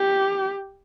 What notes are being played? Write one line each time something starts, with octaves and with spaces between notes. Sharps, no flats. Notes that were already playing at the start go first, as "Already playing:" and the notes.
Already playing: G4